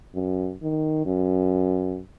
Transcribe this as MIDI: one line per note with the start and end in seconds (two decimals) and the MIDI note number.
0.15 0.54 42
0.62 1.02 51
1.06 2.00 42